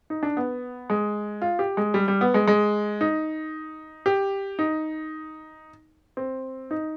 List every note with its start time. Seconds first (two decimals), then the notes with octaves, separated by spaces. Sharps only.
0.10 D#4
0.23 D4
0.37 B3
0.90 G#3
1.42 F4
1.59 G4
1.77 G#3
1.94 G3
2.08 G3
2.21 B3
2.34 G#3
2.48 G#3
3.01 D#4
4.06 G4
4.59 D#4
6.17 C4
6.71 D#4